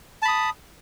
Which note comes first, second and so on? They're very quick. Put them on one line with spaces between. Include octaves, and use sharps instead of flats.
A5 B5 D#6